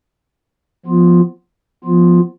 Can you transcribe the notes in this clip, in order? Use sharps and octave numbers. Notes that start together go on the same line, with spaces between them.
F3 B3 F4
F3 B3 F4